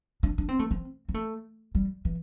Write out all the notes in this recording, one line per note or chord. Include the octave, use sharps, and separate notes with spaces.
D4
D4
C4
A3
C4
C4
A3
G3
E3